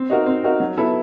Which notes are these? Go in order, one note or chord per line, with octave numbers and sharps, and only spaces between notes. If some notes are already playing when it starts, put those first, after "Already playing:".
Already playing: C4
D#4 F#4 A#4
C4
D#4 F#4 A#4
F#3
B3 E4 A4